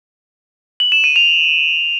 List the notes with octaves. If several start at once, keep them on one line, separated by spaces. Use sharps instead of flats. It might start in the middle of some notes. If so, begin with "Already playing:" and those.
F#7
E7
D#7
F7